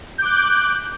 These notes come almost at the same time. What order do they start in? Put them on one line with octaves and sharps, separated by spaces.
G6 D6 F#6